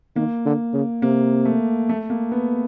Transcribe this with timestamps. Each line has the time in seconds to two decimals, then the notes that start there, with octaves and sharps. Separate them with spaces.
0.16 D#3 A#3
0.45 D3
0.73 C#3
1.02 C3 A#3
1.45 A3
1.89 A3
2.10 A#3
2.32 B3